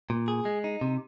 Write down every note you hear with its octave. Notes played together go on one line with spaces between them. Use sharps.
A#2
G#4
G#3
D#4
C3